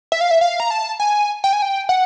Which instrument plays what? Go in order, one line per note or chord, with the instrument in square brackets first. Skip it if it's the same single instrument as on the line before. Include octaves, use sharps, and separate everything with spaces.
[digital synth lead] E5
F5
E5
F5
A#5
A5
G#5
G5
G#5
G5
F#5